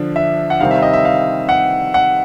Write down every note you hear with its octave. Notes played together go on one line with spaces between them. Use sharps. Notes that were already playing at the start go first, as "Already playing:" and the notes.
Already playing: D3 F3 D4
E5
F#5
C3 D#3 G3 C4 F5
E5
D#5
E5
F5
F#5
F#5